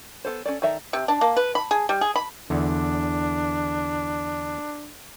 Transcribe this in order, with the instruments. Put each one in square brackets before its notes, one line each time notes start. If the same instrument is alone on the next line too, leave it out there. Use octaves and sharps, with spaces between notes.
[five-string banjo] B3 A4 C5
C#4 A4 D5
D#3 A4 D5 E5 A#5
[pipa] C3
D4
A#3
B4
B5
G#4
G3
G#4
B5
[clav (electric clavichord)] E2 D3 [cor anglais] D4